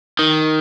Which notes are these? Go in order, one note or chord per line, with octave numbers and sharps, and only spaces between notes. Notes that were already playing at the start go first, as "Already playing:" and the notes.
D#3